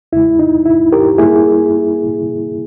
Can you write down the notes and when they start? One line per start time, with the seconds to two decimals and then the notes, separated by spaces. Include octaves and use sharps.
0.13 E2 C#3 G#3 E4
0.39 D#4
0.66 E4
0.92 G4 A#4
1.18 G2 G3 A#3 E4 G#4